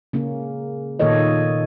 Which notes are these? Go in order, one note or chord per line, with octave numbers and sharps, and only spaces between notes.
C#3 A#3 C#4
A#2 D#3 A#3 A4 C#5 D#5